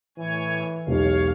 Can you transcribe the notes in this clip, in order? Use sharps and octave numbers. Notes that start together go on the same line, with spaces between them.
A2 E3 C#5 G#5
E1 B1 G4 C#5 F5